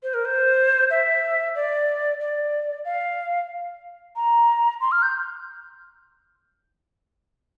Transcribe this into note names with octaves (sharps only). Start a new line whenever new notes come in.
C5
A#4
C5
E5
D5
D5
F5
A#5
C6
F6
G6